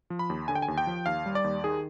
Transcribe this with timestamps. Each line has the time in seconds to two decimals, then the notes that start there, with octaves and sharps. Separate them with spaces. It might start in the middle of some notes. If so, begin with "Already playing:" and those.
0.10 F3
0.19 B5
0.30 D#2
0.48 D3 G#5
0.55 G5
0.62 G#5
0.68 D#2
0.78 G5
0.87 F3
1.06 D#2 F5
1.26 G3
1.35 D5
1.44 D#2
1.64 D#3 G#4